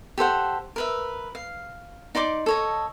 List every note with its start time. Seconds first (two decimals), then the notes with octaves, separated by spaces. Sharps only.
0.18 G4 A4 C5 F#5
0.76 A#4 B4 E5
1.35 F5
2.15 D#4 D5 C6 D6
2.46 A4 C#5 D#5